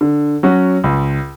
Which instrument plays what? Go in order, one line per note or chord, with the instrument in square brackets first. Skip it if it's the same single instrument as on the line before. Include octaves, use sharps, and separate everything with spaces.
[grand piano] D3
F#3 C#4 F#4
C#2